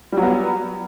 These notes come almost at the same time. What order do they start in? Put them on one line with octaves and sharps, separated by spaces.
G3 F#3 B3